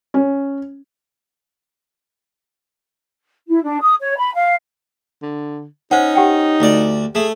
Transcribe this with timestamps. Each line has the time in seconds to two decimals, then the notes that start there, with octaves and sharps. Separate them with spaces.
0.14 C#4
3.48 E4
3.63 D4
3.80 D#6
4.00 C#5
4.16 B5
4.35 F5
5.22 D3
5.91 C#4 D#4 C5 F#5
6.15 G4 F#5 G5
6.60 D2 D5
7.15 A3 G#4